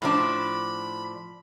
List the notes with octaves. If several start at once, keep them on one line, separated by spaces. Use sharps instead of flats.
A2 F3 D4 B5